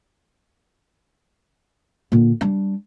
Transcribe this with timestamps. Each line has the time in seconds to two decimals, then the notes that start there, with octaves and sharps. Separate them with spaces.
2.12 A#2 D3
2.41 G3 D4